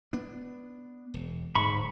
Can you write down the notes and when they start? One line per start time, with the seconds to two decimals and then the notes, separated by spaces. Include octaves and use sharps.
0.13 B3 D4
1.14 E1
1.55 D1 G#2 B5 C#6